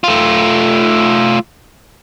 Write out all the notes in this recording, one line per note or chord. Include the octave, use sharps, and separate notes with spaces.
A3 F4